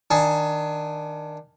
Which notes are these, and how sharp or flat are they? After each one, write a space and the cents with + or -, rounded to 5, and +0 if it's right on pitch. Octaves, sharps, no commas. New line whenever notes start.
D#3 +0 D4 +15 G#5 +25